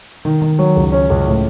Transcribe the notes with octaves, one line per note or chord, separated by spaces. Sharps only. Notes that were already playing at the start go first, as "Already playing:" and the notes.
D#3
D#3
F#3
C#2
C#4
C#2
A2